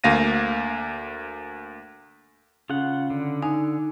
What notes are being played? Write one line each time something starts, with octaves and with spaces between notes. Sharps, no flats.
D2 A#3 F5 A#6 D#7
C#3 F4 F#5
D3
D#4 G#5